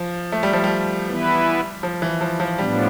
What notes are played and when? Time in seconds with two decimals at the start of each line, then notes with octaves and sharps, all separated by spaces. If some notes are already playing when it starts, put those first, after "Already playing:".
Already playing: F3
0.32 A3
0.43 G3
0.53 F3
0.64 G3
1.08 E3 B3 E4 B4
1.83 F3
2.02 E3
2.21 F3
2.40 F3
2.58 A2 F3 G3 B3 D4